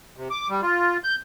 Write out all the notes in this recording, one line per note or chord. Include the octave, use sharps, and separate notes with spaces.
C3
D6
G3
F4
G6